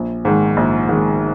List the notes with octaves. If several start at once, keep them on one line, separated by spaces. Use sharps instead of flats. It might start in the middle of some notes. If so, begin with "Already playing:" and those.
Already playing: A#1
G#2 D#3
A#1
G#2 D#3